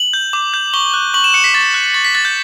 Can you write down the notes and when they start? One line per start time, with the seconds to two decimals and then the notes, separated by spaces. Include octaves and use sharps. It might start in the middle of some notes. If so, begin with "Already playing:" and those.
Already playing: F#7
0.13 G6
0.33 D6
0.54 G6
0.74 C#6 G7
0.94 F#6
1.14 C#6 F#7
1.24 E7
1.34 F#6 C#7
1.44 B6
1.54 C#6 A6
1.74 F#6
1.94 C#6 A6
2.05 B6
2.15 F#6 A6
2.25 G6